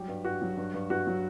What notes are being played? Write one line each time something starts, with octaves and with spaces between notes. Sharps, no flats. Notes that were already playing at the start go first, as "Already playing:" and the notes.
Already playing: F#3 G3 G4
G2
G2 F#4
F#3
G2
G2
G2 F#4
F#3